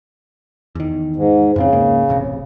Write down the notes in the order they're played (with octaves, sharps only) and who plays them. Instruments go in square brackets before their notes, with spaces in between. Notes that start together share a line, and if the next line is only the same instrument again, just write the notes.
[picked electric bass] E2 D#3
[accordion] G#2
[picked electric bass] F2 A2 C4 [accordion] C#3
[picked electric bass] C#2 G#2 A#3
E1 A1 C3